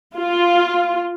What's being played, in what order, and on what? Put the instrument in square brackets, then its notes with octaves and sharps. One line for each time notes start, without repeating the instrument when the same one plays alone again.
[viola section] F4